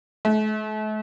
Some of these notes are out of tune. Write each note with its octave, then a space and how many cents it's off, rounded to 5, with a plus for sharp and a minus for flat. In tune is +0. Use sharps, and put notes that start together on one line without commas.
A3 -40